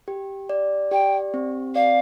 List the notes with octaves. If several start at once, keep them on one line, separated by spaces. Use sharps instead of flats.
G4
D5
G4 G5
C4
D5 F5